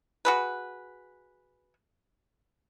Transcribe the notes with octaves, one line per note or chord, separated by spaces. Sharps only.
F#4 G#4 B4